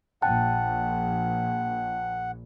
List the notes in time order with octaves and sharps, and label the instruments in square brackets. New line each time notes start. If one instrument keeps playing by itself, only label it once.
[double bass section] A#1 [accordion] F#5 [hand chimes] G5 A5 F#6